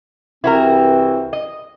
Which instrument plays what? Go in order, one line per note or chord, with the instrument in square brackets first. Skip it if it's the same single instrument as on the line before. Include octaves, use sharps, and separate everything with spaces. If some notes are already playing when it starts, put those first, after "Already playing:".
[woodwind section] C2 E3 C4 [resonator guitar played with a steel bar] E4 F#4 A#4
[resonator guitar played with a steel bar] D#5